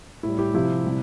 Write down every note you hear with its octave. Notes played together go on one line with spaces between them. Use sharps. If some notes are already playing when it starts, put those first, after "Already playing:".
A2 G3 E4
E4 G4
C3 F3 E4 G4
C3 G3